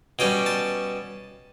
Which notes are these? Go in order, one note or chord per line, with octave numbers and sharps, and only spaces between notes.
B2 G3 C#4 G5
A5